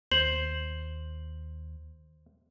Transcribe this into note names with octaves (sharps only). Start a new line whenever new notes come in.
D#2 C5 F#7